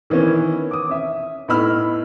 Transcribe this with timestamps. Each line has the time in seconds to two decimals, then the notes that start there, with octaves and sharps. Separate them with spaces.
0.10 D#3 E3 B3 C#4
0.71 D6 D#6
0.89 C#4 E5
1.48 A2 B3 D#4 B5 E6 F6